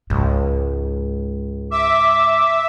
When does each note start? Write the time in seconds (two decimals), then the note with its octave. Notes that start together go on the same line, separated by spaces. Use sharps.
0.10 C#2 G#2
1.71 E5 D6